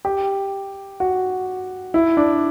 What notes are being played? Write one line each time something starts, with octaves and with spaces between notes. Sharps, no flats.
G4
F#4
E4
D4